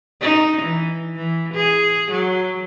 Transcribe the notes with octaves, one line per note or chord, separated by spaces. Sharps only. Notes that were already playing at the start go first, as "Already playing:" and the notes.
D#4
E3
E3
G#4
F#3